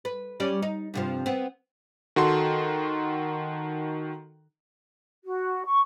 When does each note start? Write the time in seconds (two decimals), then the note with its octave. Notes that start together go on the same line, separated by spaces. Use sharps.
0.05 B4
0.40 G3 C#4 D5
0.62 D#4
0.94 G2 C3 F3
1.26 B3 C4
2.16 D#3 F#4 A4 C6
5.25 F#4
5.66 C#6